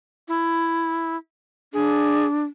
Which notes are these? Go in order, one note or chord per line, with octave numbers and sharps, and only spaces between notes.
E4
D4 G#4